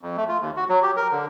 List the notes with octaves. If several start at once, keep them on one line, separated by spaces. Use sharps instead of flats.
F2
A3
F4
D#2
F#4
F#3
G4
A#4
D3